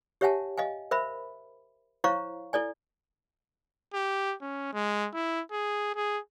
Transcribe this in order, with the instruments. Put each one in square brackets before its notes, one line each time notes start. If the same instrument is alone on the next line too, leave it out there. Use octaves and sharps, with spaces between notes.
[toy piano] G4 C#5 E5 F#5 G#5 A5
D#5 F5 G#5
A#4 C5 E5 B5
E4 C5 C#5 F5 A#5 C#6
E4 A4 D5 G#5
[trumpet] G4
C#4
G#3
E4
G#4
G#4